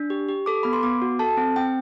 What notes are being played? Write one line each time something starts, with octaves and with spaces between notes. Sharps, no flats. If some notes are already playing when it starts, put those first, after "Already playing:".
Already playing: D4
G4
G4
A4 D6
B3 B5
C6
B3 D6
F#4
A4 A5
C4
C4 G5